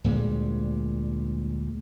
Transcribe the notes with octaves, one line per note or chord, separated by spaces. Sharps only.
D2 A#2 G3 G#3